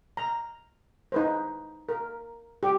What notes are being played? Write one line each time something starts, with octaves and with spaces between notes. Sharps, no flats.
A#5
D#4 B4 C5
A#4
G4